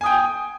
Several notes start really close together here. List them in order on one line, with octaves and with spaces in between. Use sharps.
G#5 D#6 G5